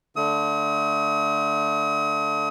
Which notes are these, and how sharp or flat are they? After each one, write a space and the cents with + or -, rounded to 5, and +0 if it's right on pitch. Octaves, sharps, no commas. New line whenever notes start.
D3 +0 A3 +0 D#6 +35